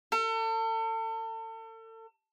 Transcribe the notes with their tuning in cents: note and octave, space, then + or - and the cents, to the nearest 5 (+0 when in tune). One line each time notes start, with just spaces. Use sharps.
A4 +35